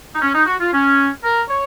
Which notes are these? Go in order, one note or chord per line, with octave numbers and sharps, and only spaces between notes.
D#4
C#4
D#4
F#4
F4
C#4
A#4
C#5